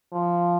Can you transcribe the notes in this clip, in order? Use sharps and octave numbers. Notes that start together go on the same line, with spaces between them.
F3